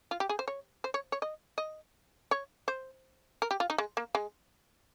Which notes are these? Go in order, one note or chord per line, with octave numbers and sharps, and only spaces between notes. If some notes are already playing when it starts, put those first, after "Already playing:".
F4
G4
G#4
C5
C#5
C5
C#5
C#5
D#5
D#5
C#5
C5
A#4
G4
F4
D#4
G#3
A#3
G#3